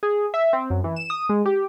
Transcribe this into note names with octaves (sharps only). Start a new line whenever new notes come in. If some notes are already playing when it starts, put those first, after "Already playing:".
G#4
E5
C4
F#2
E3
E7
D#6
G#3
G4